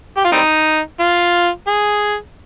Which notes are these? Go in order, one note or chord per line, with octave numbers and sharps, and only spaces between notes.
G4
F4
G3 C4 D#4
F4
G#4